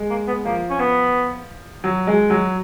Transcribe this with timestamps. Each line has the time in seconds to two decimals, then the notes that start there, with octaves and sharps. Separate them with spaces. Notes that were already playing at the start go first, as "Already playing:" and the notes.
Already playing: G#3
0.10 A#3
0.27 B3
0.45 F3 A#3
0.70 C#4
0.80 B3
1.84 F#3
2.07 G#3
2.30 F#3